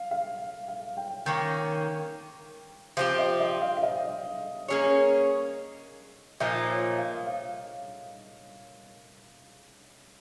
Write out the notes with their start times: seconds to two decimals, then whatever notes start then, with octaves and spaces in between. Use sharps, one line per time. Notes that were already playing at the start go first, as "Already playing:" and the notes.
Already playing: F5
0.11 F5
0.68 F5
0.97 G5
1.26 D#3 A#3 C#4 G5
2.97 F3 C4 G4 F5
3.19 D#5
3.40 D#5
3.62 F5
3.77 F5
3.83 D#5
4.68 A#3 C#4 G#4 C#5
6.40 A#2 F3 A#3 D#4 D#5
6.69 C#5
6.98 F5
7.26 F5